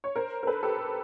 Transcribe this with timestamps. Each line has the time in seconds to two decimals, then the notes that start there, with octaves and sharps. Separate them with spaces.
0.04 C#5
0.16 A#4 C5
0.43 A#4
0.47 A4 B4
0.63 G4 A4